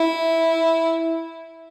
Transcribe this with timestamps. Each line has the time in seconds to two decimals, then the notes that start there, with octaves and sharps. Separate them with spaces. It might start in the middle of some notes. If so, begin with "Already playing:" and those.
Already playing: E4